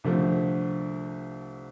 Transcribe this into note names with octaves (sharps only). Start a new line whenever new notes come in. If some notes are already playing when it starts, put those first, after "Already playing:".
C2 D3 F3 A3